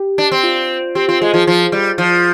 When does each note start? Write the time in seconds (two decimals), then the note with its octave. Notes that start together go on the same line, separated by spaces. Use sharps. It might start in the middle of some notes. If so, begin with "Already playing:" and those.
Already playing: G4
0.18 D4
0.32 C4
0.43 F4
0.95 C4 G4
1.08 C4 F4
1.21 G#3 F4 G#4
1.34 F3 F4 G#4
1.47 F3
1.72 G3
1.98 F3